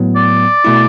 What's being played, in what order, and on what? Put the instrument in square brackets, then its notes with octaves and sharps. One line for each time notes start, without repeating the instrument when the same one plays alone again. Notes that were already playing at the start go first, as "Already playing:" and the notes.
Already playing: [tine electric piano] A2 F#3 B3
[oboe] D5
[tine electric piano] B2 A3 E4